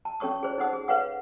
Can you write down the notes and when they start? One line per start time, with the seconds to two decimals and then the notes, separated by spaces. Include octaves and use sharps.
0.05 A5
0.20 C#4 A4 C#5 C#6 D#6
0.43 G#4 C5 C#5
0.58 D#4 A4 C5 F#5 D#6
0.73 G#4
0.88 A4 B4 C#5 F5 F#5 D#6